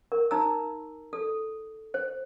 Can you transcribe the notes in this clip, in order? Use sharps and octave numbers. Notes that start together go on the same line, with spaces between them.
A#4
D#4 A#5 E6
A4
C5